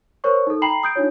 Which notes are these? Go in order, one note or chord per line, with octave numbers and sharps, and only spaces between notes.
A#4 C5 C#5 C#6
D#4 A4
G5 A#5 B5 C7 F#7
D#6 G6 D7
D4 D#4 F4 C#5